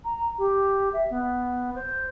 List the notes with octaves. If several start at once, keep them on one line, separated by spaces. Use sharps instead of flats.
A#5
G4
E5
B3
C5